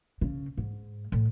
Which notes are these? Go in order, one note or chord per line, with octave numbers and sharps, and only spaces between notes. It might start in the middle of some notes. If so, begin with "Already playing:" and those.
C#3
G#2
A2